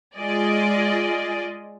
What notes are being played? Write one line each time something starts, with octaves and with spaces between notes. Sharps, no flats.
G#3 F4 G#4 D5 D#5